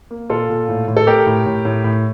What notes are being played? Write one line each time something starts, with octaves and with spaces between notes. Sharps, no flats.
A#3
A#2 F4 A4
A#2
A2
A2
A4
A3 G4 A#4
A2
A2
A2
A2